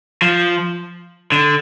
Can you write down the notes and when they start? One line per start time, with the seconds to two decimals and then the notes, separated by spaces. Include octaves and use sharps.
0.22 F3
1.32 D3